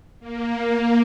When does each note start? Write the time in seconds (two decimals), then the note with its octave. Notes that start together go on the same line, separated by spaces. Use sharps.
0.20 A#3